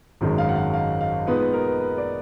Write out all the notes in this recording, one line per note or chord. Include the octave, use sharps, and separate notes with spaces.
G#1 F#2 D#3 G#3
F5
F#5
F5
F5
F5
A#2 G#3 B3 D#4 B4
B4
A#4
B4
B4
D5